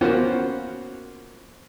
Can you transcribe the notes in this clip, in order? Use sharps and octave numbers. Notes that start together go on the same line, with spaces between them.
A#3 B3 C#4 F4 F#4 C5